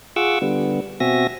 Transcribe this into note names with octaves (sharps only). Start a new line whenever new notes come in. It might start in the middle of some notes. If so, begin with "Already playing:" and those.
F4 G#4 F#5 C#6 D6 E6
D3 G3 B3
B2 C4 F#4 E5 G#5 A#6